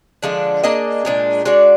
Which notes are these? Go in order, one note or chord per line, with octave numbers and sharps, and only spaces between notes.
D3 F3 G#3 D4
A#3 D4 G#4 D#5
A#2 G#3 D4
G#3 D4 F#4 D5